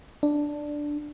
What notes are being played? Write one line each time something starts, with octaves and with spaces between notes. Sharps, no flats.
D4